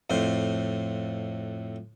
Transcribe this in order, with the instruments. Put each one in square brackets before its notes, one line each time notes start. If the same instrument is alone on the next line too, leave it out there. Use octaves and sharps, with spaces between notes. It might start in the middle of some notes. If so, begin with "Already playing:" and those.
[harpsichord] F2 A2 C5